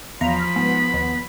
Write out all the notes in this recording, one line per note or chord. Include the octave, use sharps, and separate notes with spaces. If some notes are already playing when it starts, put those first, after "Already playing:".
E2 F3 F5 A#5 B5
G#2 B3
D#2